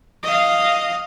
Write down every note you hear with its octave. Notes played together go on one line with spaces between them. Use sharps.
D#5 F5